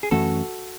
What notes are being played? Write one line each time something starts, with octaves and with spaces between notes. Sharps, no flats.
G#4
F#2 E3 A3 C#4 F#4 A4